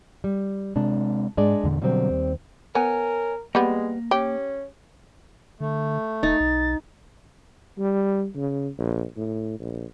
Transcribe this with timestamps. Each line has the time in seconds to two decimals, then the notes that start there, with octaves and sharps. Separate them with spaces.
0.24 G3
0.76 C3 G#3 D4
1.37 G#2 G#3 D4 D5
1.63 E2 A#2 D3
1.82 B2 D3 F#3 G3 C4
2.10 D#2
2.75 B3 A#4 C#5 G#5
3.55 G3 G#3 A#3 B3
4.11 C#4 G4
5.60 D3 A3
6.23 D#1 D#4 A6
6.40 B1
7.79 G3
8.36 C#3
8.79 A#1
9.17 A2
9.60 A#1